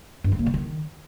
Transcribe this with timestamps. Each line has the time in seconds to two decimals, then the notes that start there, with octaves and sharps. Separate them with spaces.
0.24 G2
0.32 D#3
0.39 A#3
0.46 C#3
0.54 D#3